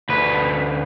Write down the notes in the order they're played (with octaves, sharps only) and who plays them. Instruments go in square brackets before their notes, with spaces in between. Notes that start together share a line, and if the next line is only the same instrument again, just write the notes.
[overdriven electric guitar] D2 B4